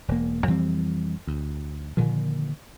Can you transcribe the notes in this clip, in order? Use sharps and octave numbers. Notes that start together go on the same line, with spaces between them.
E1 A#3
F2 E3 G3 C4
D2
A#2 D3 D#3 F3